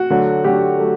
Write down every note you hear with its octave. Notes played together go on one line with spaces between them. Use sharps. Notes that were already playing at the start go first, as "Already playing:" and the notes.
Already playing: F#4
D3 F#3 A3
D3 F#3 A3 G4
F#3 A3